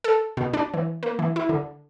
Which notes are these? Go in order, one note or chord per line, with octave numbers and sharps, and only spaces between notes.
A4
B2
D4
E3
A#3
E3
E4
D3